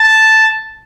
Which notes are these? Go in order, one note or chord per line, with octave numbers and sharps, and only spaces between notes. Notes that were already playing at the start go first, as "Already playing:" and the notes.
Already playing: A5